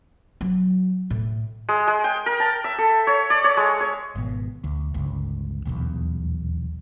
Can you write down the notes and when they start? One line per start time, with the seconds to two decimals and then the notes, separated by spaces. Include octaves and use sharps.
0.41 F#3
1.10 A2
1.69 G#3
1.88 G#3
2.04 G5
2.26 A#4
2.40 A5
2.64 E5
2.78 A4
3.07 C#5
3.30 D5
3.44 C#5
3.57 G#3
3.80 C#5
4.15 G#1 B2
4.64 D2
4.94 G1 C#2
5.65 D#1 B1 E2